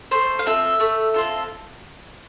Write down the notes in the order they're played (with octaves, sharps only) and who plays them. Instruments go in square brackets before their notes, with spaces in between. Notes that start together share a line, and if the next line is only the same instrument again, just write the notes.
[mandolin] A3 C5
F5
C4 F4 A4 E5
A3
C4 F4 A4